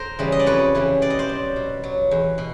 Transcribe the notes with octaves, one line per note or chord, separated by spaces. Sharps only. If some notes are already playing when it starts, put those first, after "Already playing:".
Already playing: A#4 C5
C#3 E3 G3
D#5
D5
F2 B4 C#5
C#3 E3 G3
B2 D5
D#5
C5 D5
F#3
B2
F#3
E2
B2